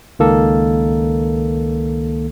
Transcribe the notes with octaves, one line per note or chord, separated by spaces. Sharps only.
C#2 D#3 A#3 A4